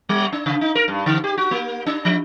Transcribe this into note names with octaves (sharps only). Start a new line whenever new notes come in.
G3
D4
C#3
D#4
A#4
G2
D3
G4
F#4
A#3
D4
F3